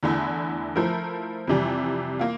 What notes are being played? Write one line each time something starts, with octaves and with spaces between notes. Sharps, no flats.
E2 D3 A3 E4
F3 A3 E4 A#4
F2 C3 E3 G3
A#3 F4